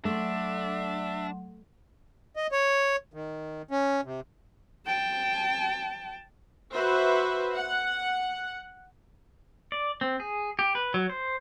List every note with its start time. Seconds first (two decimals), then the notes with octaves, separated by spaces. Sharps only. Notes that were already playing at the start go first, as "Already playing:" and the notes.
0.05 F#3 A3 D4 E5 F#5 C6
2.36 D#5
2.52 C#5
3.14 D#3
3.71 C#4
4.05 C3
4.86 G5 A5
6.74 F#4 B4 C5 E5
7.54 F#5
9.72 D5
10.01 C4
10.20 G#4
10.59 G4
10.75 B4
10.94 F#3
11.10 C5